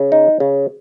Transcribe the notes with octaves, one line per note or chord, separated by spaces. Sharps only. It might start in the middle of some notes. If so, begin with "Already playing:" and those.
Already playing: C#3
D#4
C#3